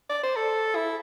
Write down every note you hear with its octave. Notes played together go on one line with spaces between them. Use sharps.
D5
C5
A4
E4